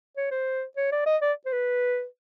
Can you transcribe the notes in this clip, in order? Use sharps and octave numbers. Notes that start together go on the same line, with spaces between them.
C#5
C5
C#5
D5
D#5
D5
C5
B4